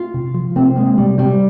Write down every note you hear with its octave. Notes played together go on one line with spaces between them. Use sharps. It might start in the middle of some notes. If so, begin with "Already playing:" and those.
Already playing: F4
C3
F3
C3 C4
G#3 A#3
C3 G3
G3 C4